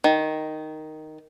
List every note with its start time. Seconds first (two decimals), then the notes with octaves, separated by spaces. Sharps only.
0.04 D#3